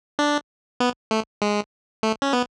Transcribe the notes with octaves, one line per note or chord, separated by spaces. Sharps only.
D4
B3
A3
G#3
A3
C#4
B3